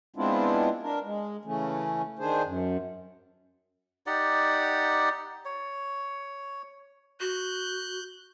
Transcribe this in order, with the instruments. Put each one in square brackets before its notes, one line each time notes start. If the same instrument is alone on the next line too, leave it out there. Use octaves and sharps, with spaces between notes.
[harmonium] G#3 B3 C4 D4 E4 F4
D4 A#4
G#3
C#3 E3 A3 C#4
D#3 D4 G#4 C5
F#2
[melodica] D#4 G4 D5 F#5
C#5
[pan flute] F#4 [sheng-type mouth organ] F#6 G6